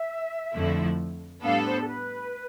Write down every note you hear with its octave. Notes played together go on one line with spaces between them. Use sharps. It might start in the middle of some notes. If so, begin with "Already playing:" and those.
Already playing: E5
F2 D3 F3 A3 E4
A2 G3 B3 D4 A4 F5
C5
A4
B4